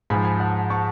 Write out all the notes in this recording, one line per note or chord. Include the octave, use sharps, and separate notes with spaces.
G#2 F3 G#5 B5
G#5 B5
F#5 A5
A5 C#6